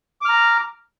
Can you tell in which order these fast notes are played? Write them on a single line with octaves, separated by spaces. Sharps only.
D6 F6 A#5